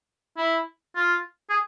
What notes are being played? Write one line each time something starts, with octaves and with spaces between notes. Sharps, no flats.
E4
F4
G#4